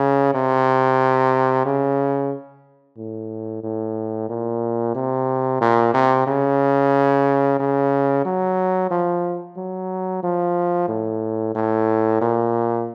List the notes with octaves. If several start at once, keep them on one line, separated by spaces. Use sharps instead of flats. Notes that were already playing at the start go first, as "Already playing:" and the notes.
Already playing: C#3
C3
C#3
A2
A2
A#2
C3
A#2
C3
C#3
C#3
F#3
F3
F#3
F3
A2
A2
A#2